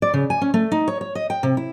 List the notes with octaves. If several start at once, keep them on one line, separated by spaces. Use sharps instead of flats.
D5
C#3
G#5
C#4
A3
D#4
C#5
C#5
D#5
G5
C3
E4